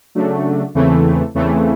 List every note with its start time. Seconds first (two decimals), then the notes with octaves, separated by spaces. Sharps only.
0.15 C#3 F#3 A3 D4 F#4
0.74 E2 C#3 E3 A3 C4
1.34 E2 C#3 E3 A3 C4